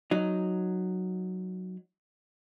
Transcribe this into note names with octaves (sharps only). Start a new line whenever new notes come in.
F#3 D#4